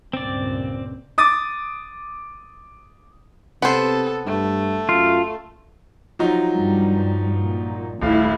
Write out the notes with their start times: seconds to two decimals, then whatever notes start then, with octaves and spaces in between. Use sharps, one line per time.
0.13 C#2 G2 A#2 C4 D5
1.18 D6 D#6 A6
3.62 C3 B3 A4 C5
4.26 G2 A3
4.89 F#2 F4
6.19 F3 F#3 D#4
6.52 G2 G3
7.40 A#2
8.02 D#1 A3 E4 F5